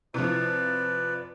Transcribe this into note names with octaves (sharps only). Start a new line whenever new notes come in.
C3 F3 E4 B4 D5